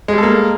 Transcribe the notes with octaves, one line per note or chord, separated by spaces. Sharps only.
G3 G#3 A#3 A4